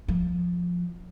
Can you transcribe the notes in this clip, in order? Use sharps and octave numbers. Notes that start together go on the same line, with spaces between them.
F3